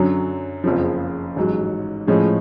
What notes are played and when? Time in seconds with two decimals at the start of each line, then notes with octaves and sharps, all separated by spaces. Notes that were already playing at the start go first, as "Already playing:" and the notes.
Already playing: F#2 D3 F#3 C#4
0.64 F#1 F2 C#3 F3
1.36 A1 G#2 F#3
2.07 A2 F3 G#3 C#4 G#4